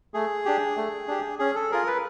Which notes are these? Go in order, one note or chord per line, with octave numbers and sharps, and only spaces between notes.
A3 G#4
D4 G4
A3
D4 G4
C#4 G#4
A4
F4 G#4 A#4
B4